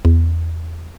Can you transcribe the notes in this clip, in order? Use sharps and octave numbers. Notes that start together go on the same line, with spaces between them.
E2